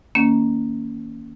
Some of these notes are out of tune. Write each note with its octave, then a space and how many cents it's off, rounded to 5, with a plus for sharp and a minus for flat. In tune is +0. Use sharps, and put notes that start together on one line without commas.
D#3 +0 A#3 +0 C#4 +20